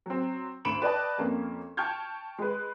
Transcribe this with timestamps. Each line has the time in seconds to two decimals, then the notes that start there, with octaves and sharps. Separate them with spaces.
0.06 F#3 C4
0.65 D2 B5 D7 E7 F#7
0.82 B4 D5 D#5 G5 A5
1.18 F2 A#3 C#4
1.77 G5 A5 C#6 F6 G6 G#6
2.38 G#3 B4